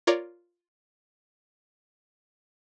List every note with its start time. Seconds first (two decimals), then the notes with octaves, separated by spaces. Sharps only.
0.07 F4 A#4 C#5 D5